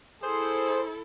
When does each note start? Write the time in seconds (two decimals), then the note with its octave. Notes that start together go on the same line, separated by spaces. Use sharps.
0.23 E4 G#4 A4 C5